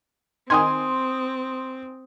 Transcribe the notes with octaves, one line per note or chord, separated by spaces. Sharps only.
D#3 C4 G#5 C6 D#6